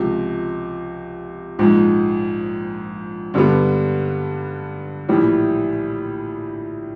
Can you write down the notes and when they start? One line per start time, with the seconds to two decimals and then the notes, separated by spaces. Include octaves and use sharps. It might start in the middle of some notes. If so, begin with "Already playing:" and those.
Already playing: C#2 C3 F3
1.59 A#1 G#2 F3
3.34 G2 D3 G3 B3
5.09 A#1 A2 E3 G3